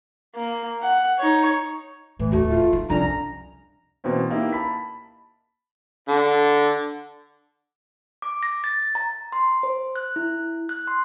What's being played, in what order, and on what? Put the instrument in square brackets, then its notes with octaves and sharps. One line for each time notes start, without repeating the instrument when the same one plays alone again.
[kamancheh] A#3
F#5
D#4 C#5
[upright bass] A2 [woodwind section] E3
[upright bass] D1 D#2 [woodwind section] A3 [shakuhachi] F#4
[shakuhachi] F4
[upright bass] D#3
[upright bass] C2 F2 [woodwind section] D3 C#4 A#5 [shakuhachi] D4
[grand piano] B2 E3 A#3 C4 C#4
A#3 D#4 E4 G4
A5 B5 B6
[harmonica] D3
[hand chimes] D6
A#6
A6
A#5
C6
C5
F#6
E4
F#6
C6